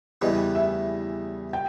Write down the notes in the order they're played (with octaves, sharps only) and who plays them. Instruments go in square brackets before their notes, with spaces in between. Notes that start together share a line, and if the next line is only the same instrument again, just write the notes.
[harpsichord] E2 C#3 E3 G3 B3 [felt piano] D#5
[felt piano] E5
G5